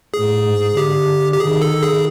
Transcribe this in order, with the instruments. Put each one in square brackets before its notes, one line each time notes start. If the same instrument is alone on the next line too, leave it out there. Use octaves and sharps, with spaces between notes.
[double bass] A2 [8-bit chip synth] G#4
[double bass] G#2
[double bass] D3 [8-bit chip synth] G4
[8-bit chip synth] G4
[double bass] D#3 [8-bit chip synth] G#4
[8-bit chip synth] A4
G#4